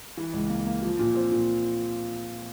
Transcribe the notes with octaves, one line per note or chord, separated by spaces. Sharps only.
E3
C#2
A#3
A#3
F3
A#2
C4
A#2